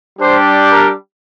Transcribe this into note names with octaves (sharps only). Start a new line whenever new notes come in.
G3 D4 G4 C5
A#4